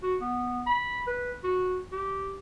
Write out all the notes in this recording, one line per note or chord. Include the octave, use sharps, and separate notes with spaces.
F#4
B3
B5
B4
F#4
G4